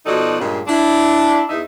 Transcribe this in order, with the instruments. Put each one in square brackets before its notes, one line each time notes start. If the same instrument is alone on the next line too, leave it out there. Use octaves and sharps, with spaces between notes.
[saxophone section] B2 F3 D#4 F#4 A4 D5
G2 A#2 C#3 G#3
D4 E4
E2 D#4 E5